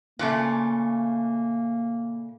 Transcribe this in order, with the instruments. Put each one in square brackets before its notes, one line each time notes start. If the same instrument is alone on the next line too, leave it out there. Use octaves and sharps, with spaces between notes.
[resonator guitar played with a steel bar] A#2 C#3 A3 [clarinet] A#3